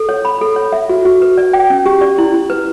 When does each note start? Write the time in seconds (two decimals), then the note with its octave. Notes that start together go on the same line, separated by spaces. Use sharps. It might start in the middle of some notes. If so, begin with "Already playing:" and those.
Already playing: A4
0.09 C#5
0.25 B5
0.41 A4
0.56 C#5
0.72 E5
0.89 F#4
1.05 F#4
1.22 B4
1.37 D5
1.53 G5
1.70 C#4
1.86 G4
2.01 D5
2.18 E4
2.34 E4
2.50 B4